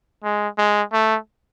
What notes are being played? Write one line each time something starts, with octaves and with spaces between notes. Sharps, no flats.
G#3
G#3
A3